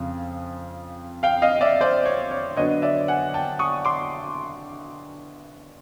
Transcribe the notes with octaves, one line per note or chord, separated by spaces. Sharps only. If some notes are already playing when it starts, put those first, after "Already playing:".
Already playing: F2 C#3
F5 G5
D#5 F5
D5 E5
C5 D5
C#5
C#5
D3 F#3 B3 D4 C#5 D#5
D5 E5
F#5 G#5
G5 A5
C#6 D#6
C6 D6